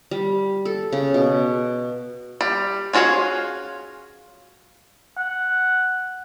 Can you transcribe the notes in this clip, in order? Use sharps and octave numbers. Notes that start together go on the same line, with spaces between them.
G3
A4
C#3
B2
G3
C#4 F4 F#4 G#4 C#5
F#5